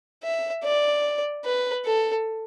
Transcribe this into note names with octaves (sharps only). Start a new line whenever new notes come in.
E5
D5
B4
A4